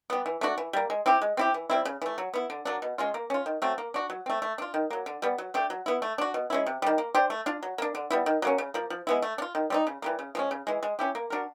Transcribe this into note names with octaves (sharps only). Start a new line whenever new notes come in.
G3 B3
E3
A3 D4 F#4
E3
G3 A#3
G#3
C4 E4 G4
G#3
C4 E4 G4
E3
G3 C4 E4
C#3
E3 A3
F#3
B3 E4
D3
F#3 A#3 D4
B2
G#3 C#4 F4
A#3
C#4 F4
D#3
F#3 A3 C4
A#3
D4 F#4
F#3
A3 C4
A3
D4 F4
D#3
F#3 A#3
D3
G3 B3
F#3
A3 D4 G4
F#3
B3 E4
A3
D4 F#4
B2
G#3 C#4 E4
C3
D#3 G3
A#3
D4 G4 C5
A3
D4 F4
F#3
A#3 D4
D3
G3 B3 E4
D#3
F#3 A#3 C#4
C#3
F3 A#3
F3
G#3 B3 E4
A3
D4
F4
D#3
G3 C4 D#4
C#3
E3 G3 A#3
C#3
F3 G#3 C#4
C#3
E3 G#3
G#3
C#4 E4 G4
A#3
D4 F#4 A#4